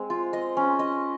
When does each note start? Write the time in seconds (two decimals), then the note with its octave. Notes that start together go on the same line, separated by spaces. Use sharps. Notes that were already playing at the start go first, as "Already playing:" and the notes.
Already playing: G#3 C4
0.10 F4
0.33 D#5
0.57 C#4
0.79 D#5